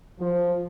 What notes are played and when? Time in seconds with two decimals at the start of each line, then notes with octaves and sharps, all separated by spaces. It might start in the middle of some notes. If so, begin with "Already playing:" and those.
0.20 F3